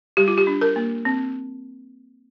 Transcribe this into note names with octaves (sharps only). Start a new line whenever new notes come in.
G3 G4
F4
G4
D4
A#4
A#3
C4